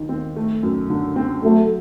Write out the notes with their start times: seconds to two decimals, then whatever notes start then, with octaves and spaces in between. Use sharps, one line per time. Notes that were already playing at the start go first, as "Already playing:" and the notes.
Already playing: D#2 D#3
0.09 C4
0.36 A3
0.63 F#2
0.90 D3
1.16 C4
1.44 F#3 A3